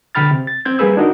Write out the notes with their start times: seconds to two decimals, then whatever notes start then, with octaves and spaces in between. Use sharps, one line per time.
0.15 B2 D3 G5 B5 F6 A6
0.31 C3
0.47 A6
0.65 C4 G6 G#6
0.78 G3 A#3 G#4 B4 E6 G#6
0.97 D4 D#4 F#4 A#4 D#5